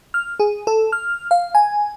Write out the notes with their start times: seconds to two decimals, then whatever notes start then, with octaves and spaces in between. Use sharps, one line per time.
0.14 F6
0.40 G#4
0.67 A4
0.92 F6
1.31 F5
1.55 G#5